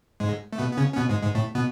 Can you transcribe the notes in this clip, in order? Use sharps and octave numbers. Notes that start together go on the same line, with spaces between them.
G#2 G#3
A3
B2 B3
B3
C#3 C#4
C#4
B2 B3
G#2 G#3
G#2 G#3
A2 A3
B2 B3